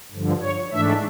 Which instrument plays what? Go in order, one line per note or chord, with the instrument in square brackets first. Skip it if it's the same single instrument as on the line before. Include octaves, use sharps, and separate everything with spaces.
[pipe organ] G2 D3 F3
C#5
G#2 E3 A3 D4 E5